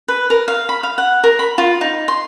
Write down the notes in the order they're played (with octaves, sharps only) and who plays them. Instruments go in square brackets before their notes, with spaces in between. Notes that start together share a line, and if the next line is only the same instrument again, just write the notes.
[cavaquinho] B4
A#4
F5
B5
F5
F#5
A#4
B5
F4
D#4
C6